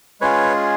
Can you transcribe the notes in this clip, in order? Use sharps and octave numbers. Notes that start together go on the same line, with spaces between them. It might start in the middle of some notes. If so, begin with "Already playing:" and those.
G#3 C#4 F4 G#4 B4 C#5